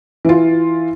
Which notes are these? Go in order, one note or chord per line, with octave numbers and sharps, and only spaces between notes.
E3 F4